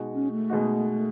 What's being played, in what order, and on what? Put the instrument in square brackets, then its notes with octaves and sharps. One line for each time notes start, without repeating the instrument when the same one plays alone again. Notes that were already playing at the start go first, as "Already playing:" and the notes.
Already playing: [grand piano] B2 G#3 D#4 F#4
[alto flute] C#4
A3
[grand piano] B2 G#3 D#4 F#4